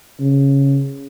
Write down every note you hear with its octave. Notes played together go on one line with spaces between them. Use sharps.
C#3